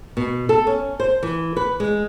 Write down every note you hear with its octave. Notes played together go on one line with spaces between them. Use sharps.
B2
A4
C#4
C5
E3
B4
G#3